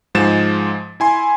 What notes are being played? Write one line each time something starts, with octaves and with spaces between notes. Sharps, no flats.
G#2 F3 G#3 A6 E7
E4 G#5 C6